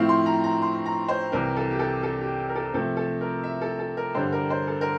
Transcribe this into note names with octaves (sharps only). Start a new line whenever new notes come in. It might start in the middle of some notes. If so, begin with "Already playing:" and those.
Already playing: A2 F3 C4 E4 F5
C6
A#5
A#5
C6
A#5
C5
C2 C3 E3 A#4
A4
G4
A4
A4
G4
A#4
A4
C3 F3 A3 A4
A4
A#4
E5
A4
A4
A#4
G2 D3 G3 C5
A#4
C5
A4
A#4